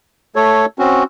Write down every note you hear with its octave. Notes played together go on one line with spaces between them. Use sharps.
A3 A4 C#5
C4 C#4 F#4